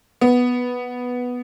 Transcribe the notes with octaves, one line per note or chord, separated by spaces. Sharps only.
B3